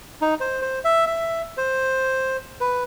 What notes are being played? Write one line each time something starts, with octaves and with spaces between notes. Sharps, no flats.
D#4
C5
C5
E5
E5
C5
B4